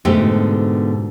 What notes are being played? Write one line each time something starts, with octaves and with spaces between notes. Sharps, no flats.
G#2 B2 D3 A3 F#4 G4